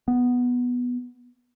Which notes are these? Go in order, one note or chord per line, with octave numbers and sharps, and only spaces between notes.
B3